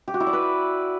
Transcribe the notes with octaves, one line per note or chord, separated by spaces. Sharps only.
G4
F#4
E4
D5
B4